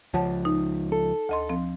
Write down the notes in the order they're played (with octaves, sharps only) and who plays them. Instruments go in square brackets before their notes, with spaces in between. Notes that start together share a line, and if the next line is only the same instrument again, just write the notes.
[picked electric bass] C#2 F3 [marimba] C#5 F#5 A5
[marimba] D#4
[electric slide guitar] A4
[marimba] D2 D#5 C6
F3 C4